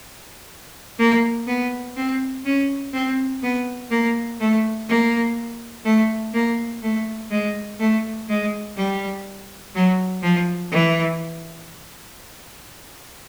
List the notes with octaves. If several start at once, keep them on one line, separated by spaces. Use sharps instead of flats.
A#3
B3
C4
C#4
C4
B3
A#3
A3
A#3
A3
A#3
A3
G#3
A3
G#3
G3
F#3
F3
E3